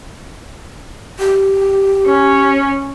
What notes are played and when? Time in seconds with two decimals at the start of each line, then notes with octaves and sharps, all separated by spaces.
1.19 G4
2.06 C#4